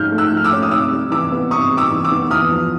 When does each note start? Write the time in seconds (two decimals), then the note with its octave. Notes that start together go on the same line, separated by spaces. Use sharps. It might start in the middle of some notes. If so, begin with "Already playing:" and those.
Already playing: G#2 F3 A3 C#4 F6 G6
0.12 A3
0.18 E6 F#6
0.32 F3
0.37 F6
0.44 D6 E6
0.52 C#4
0.63 D#6
0.71 C3 D6 E6
0.92 G3
1.11 E3 D6 E6
1.32 B3
1.51 C3 C#6 D#6
1.71 G3
1.77 D6 E6
1.91 E3
2.04 D6 E6
2.11 B3
2.31 E2 D#6 F6
2.51 F3